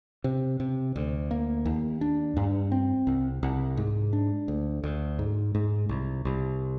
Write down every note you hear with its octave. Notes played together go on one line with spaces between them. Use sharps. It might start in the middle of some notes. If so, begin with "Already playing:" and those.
C3
C3
D2
A#3
D#2
D4
G2
C4
C2
C2
G#2
D4
D2
D2
G#2
G#2
C2
C2